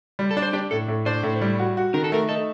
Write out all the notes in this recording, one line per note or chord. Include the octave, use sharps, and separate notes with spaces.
G3
A4
D4
C5
D4 G4
A2 A4
A2
D4 C5
A2
G3
F#4
F#4
D#3 A#4
A4
A3 A#4
D#4 A4